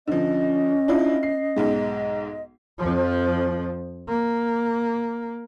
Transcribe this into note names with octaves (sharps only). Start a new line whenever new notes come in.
D3 F3 C#4 D#5
D4 E4 F4
C7
B1 G#2 G#3
F2 F3
A#3